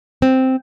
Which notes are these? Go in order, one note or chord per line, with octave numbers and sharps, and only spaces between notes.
C4